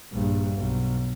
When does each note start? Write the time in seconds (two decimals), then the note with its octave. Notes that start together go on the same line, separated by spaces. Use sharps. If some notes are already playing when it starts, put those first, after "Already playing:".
0.13 A#1 G2
0.56 B1